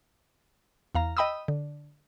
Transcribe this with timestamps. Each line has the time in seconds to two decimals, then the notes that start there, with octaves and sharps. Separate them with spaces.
0.95 E2 F5 A#5
1.17 D#5 G5 B5 D#6 E6
1.48 D3